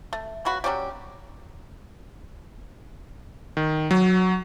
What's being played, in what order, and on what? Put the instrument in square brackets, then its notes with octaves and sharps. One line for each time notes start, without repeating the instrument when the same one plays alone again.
[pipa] A3
C#3 B3 F#4 B5
F#3 G3 C#4 G4
[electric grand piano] D#3
F#3